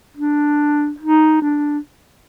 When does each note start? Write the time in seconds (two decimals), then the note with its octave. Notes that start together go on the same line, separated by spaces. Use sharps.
0.17 D4
1.00 D#4
1.42 D4